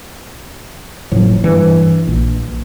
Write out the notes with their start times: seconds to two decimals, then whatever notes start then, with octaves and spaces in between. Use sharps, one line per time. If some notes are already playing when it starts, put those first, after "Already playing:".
1.12 F#1 A2 F3 F#3
1.44 G2 E3 G3
2.07 A#1